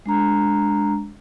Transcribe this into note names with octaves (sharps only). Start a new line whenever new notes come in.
G#3 D4 A#5